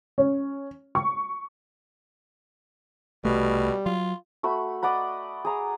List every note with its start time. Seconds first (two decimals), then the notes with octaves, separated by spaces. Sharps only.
0.18 C#4
0.95 C#6
3.25 C2 B2 G3 A3
3.86 F#3 F4
4.43 A3 F#4 B5
4.83 D5 D#5 F#5 B5
5.45 G#4 A#5